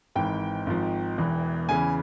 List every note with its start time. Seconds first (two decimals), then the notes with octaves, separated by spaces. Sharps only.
0.15 G#1 G#2 E3 G5
0.66 G#1 G#2 F3
1.18 E1 E2 E3
1.69 E2 C#3 E3 G#5